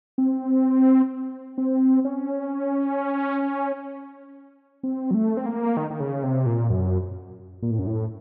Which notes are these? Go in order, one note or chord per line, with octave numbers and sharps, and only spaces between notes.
C4
C4
C#4
C4
F#3
A3
C4
A#3
D#3
D#3
C#3
C3
A#2
F#2
A#2
A2
F#2
A2